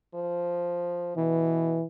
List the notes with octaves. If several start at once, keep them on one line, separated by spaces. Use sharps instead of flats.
F3
B2 E3